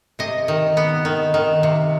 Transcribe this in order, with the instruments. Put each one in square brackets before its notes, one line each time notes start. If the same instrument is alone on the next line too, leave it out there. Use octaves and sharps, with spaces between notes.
[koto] C3 D#5
D#3
B3
D#3
D#3
C3